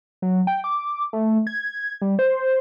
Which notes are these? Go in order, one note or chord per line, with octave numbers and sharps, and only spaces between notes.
F#3
G5
D6
A3
G#6
G3
C5